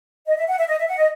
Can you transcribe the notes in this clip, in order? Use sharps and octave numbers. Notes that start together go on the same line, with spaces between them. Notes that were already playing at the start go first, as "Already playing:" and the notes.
D#5
E5
F#5
E5
D#5
E5
F#5
D#5